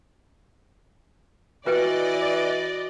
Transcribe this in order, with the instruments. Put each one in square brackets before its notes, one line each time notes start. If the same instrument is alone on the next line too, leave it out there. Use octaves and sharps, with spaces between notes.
[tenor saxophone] E3 [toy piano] F4 B4 G5 [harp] F#4 [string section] D5 D#5